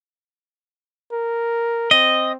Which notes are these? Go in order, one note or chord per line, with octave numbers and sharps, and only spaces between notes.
A#4
C4 D#5